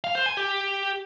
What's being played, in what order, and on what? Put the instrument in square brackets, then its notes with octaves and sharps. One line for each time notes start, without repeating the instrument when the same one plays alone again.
[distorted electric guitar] F5
C5
G#5
G4